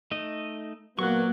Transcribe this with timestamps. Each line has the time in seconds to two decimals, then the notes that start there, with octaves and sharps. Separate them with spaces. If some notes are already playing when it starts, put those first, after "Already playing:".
0.11 A3 D#4 D#5
0.99 A#2 F#3 A#3 B3 C#6 F#6